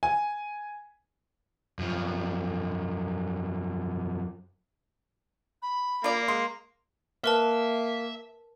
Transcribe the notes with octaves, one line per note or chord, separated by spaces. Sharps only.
G#5
F#2 F3
B5
A#3 F4 D5
G#3 C6
A#3 A#4 B4 E5 A5